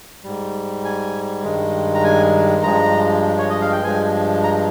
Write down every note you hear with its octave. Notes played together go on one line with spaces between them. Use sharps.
G#2 G3
G#5
G2 D#3 G#3
A#5
G#5
G2 F3 G#3 A#5
C#5
D#5
F5
G5
G2 F3 G#3 G#5
A#5